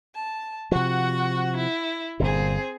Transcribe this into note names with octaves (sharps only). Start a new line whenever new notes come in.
A5
C3 F3 F#4 F#5
E4
G1 A#2 C4 G#4